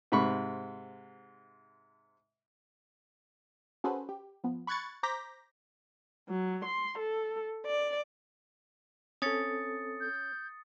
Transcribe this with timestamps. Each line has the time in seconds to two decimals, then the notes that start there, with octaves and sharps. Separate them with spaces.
0.12 G#2 C3 B5 C#6
3.84 C#4 F#4 G#4 A4 B4 C5
4.09 G4
4.44 F3 B3
4.67 B5 C#6 F#6 G#6 A6 C#7
5.03 C5 A#5 D6 G6 A#6 B6
6.30 F#3
6.66 C6
6.99 A4
7.66 D5
9.22 C4 C#4 A4 D#6 A6 C#7
10.01 G6